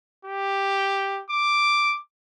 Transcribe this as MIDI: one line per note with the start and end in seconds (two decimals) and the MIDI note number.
0.25 1.20 67
1.30 1.97 86